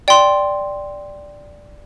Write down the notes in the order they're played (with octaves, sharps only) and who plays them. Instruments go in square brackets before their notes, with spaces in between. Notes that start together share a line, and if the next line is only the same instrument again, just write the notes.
[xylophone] D5 G5 C6